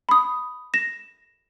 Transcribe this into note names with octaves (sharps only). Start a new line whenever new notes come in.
B5 D#6
A#6 E7